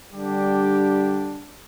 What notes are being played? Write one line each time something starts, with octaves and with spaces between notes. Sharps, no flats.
D3 G3 D4 G4